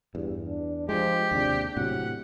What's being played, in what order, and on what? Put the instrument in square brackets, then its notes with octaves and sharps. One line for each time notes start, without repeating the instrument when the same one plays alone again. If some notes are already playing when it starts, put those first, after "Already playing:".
[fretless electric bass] E2 [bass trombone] G2
[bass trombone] D4
[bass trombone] F3 [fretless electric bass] G#3 [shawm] G4
[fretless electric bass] D#2 C3 [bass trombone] D4
[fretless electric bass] A2 C3 [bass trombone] F#3 [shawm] F#5